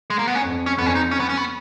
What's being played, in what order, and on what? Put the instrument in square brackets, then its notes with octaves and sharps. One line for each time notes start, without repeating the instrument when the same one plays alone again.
[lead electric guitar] G#3
A#3
B3
C#4
[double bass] F2
[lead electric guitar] C#4
[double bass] F2 [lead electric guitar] B3
[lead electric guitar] C#4
D#4
C#4
B3
C#4
B3